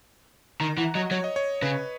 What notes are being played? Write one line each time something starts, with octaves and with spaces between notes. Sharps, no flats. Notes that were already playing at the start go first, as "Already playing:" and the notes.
D#3 A#5
E3 F#5
F#3 D#5
F#3 C#5
D#5
C#5
C#3 B4